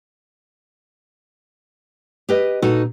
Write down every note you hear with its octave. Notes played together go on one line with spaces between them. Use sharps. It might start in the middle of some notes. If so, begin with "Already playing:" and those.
G4 B4 D#5
A#2 D#4 F#4 A4